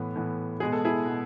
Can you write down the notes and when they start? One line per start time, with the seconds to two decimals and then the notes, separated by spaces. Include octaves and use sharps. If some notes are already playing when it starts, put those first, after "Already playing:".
Already playing: A2 E3 B3
0.15 A2 E3 B3
0.60 B2 G#3 B3 G#4
0.72 A4
0.85 E4 G#4
1.05 B2 G#3 B3